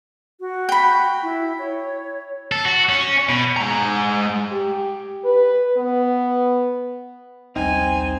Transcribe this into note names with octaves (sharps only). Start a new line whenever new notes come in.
F#4
G5 B5
E4
C#5
A4
F#4
C#4
B2
G#3 A#5
G4
B4
B3
A#1 D#2 G3 C4 D#4 G#5